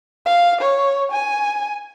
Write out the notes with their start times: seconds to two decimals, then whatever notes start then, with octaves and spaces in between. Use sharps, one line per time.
0.26 F5
0.61 C#5
1.12 G#5